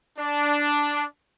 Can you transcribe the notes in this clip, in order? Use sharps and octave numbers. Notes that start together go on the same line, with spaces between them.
D4